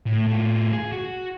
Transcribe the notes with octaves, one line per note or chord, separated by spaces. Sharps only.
A2
A2 F4
G#4
F#4